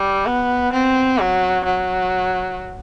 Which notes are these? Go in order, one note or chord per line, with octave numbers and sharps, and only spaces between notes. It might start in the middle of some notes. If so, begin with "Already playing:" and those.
Already playing: G3
B3
C4
F#3
F#3